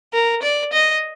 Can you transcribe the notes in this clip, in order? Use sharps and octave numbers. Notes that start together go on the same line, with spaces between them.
A#4
D5
D#5